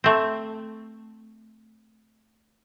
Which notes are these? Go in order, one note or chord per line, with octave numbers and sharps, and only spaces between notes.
A3 C4